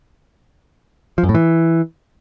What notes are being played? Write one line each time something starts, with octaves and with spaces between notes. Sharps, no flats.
F3
F#2
A2
E3